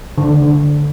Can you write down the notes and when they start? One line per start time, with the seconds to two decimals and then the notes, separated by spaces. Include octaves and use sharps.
0.18 D3